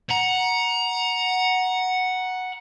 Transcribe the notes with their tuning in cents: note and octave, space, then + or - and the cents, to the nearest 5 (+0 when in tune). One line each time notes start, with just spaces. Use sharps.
F#5 +0 A#5 +20